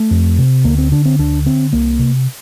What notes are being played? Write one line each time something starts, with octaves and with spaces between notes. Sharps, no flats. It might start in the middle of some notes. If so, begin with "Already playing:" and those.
Already playing: A3
F2
C3
D2 A#3
C4
D3 D4
C4
D2 D4
D3 C4
C2 A#3
C3